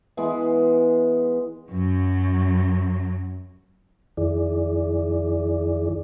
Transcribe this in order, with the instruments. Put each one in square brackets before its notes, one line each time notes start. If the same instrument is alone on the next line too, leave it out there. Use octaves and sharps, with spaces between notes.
[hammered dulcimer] E3 G#3 B3 B4
[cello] F#2 F#3
[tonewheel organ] F2 D#3 E4 G#4 D5